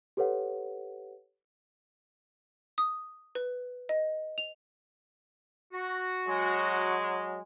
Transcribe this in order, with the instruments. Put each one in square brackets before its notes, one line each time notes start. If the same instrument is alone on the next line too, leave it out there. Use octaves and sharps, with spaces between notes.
[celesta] G4 A4 B4 C#5 F#5
[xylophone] D#6
B4
D#5
F7
[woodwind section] F#4
[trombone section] F#3 G#3